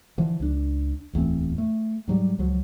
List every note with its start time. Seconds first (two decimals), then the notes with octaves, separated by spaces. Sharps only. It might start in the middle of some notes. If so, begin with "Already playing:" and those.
0.18 D3 E3 F3
0.40 C#2 D4
1.13 D1 E2 A3 C4
1.58 A3
2.08 G#2 F#3 G3
2.39 C#2 F3 F#3